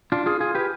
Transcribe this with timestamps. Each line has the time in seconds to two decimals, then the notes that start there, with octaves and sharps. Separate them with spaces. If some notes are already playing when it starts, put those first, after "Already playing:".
0.12 D4 F4
0.26 F4 G#4
0.40 F4 G#4
0.55 G4 B4